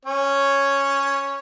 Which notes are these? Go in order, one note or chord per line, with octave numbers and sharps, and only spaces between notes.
C#4 C#5